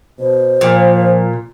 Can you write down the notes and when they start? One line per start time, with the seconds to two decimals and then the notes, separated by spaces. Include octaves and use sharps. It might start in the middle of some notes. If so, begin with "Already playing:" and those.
0.19 B2 C5
0.61 A#2 F3